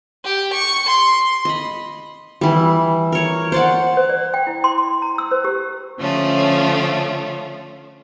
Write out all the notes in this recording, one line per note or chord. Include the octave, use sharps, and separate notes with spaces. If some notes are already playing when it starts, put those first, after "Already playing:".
G4
C#6
C6
D#5 B5
E3 G3
A#4 C#5
C5 D5 F#5
C5
D5
G5
E4
C6
C6
A#5
E6
C5
G4
D3 F3 A3 C#4